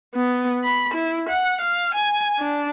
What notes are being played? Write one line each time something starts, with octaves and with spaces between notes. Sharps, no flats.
B3
B5
E4
F#5
F5
G#5
D4